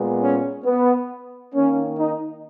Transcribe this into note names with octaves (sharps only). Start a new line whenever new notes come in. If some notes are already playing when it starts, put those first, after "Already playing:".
Already playing: A#2 G#3 B3
C#4
B3
D#3 A#3 C#4
D#4